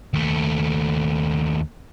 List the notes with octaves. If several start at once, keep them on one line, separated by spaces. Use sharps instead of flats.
D#2 A3